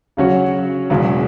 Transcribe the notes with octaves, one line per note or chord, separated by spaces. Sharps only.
C#3 F#3 C#4 F#4 C#5
E1 E2 C#3 F#3 B3